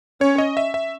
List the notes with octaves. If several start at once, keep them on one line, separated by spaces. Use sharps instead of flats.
C#4 C#5
D#5
E5
E5